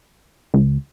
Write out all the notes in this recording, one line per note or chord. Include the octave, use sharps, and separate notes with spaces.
C#2